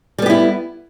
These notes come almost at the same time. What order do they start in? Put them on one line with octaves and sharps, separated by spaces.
G3 B3 G4 E4